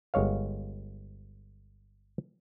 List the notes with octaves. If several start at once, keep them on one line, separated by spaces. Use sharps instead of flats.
G1 G#3 C#5 F5